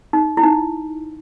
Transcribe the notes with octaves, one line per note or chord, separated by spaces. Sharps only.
D#4
E4
D#4